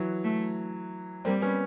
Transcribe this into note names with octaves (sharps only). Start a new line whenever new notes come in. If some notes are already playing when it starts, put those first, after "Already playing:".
Already playing: E3 F#3
A3
G3 A#3 C4
B3 C#4